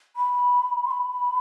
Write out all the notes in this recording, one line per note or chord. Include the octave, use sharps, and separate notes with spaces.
B5
C6
B5